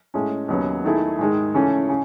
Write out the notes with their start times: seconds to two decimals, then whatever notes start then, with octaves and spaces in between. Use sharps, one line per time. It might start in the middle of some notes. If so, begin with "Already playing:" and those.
0.14 A2 G#3 C#4
0.48 D#2 C#3 F#3 B3
0.84 D#3 A3 E4 G#4
1.19 G#2 D#3 G#3
1.54 C#3 E3 A3 C#4
1.89 C#3